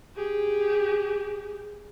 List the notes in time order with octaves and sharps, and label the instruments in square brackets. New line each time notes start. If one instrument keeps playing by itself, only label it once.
[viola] G4 G#4